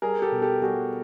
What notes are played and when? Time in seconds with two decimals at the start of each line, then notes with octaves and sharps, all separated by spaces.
0.02 G3 G#4 A#4
0.22 G4 A4
0.32 B2
0.42 G4 A4
0.62 G3 F#4 G#4